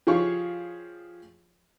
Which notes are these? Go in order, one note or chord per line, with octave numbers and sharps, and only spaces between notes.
F3 G4 G#4 C#5 F5 C#6